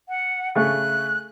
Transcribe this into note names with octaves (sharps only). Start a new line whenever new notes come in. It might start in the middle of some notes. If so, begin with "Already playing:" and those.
F#5
C#3 A3 F#6